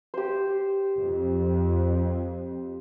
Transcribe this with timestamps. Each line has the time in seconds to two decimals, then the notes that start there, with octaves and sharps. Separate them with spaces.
0.14 G4 C5
0.99 F2